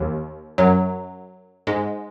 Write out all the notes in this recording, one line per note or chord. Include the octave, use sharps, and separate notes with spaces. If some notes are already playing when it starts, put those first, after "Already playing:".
Already playing: D#2 D#3
F#2 F#3
G#2 G#3